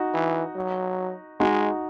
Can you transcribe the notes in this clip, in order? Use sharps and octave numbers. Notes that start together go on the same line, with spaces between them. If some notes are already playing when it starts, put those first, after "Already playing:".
Already playing: D#4 F#4
E3
F#3
G#3 D#4 F#4